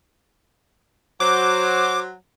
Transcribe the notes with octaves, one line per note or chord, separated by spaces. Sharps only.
F#3 C5 D6